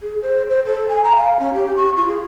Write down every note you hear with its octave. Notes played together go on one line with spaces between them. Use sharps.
G#4
C5
C5
A4
G#5
A#5
F5
C#4
G4
C#6
F4
G#4